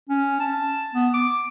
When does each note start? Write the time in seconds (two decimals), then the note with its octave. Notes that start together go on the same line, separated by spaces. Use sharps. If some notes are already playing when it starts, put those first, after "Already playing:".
0.09 C#4
0.40 A5
0.94 B3
1.14 D6